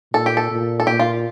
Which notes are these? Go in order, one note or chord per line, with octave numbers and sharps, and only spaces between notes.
A#2 A4
G4
A4
A#2
A4
A#2 G4
F4